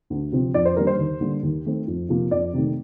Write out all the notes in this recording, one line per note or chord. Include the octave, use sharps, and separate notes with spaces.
D2
C3 F3 C4
F2 D5
C5
D#3 G3 A#3 D4 A#4
C5
D#2
D3 G3 A#3
D#2
D#3 A3 C4
F2
C3 F3 A#3
F2 D5
C3 D#3 A3